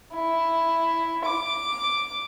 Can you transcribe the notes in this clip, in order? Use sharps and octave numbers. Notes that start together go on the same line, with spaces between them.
E4
D6